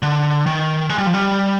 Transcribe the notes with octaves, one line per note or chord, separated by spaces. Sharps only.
D3
D#3
G#3
G3
F3
G3